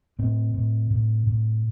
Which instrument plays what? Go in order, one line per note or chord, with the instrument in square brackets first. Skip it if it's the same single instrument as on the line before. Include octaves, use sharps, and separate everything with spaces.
[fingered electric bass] A2 C4
A2
A2
A2